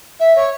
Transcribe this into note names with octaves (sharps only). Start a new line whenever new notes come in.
E5
C#5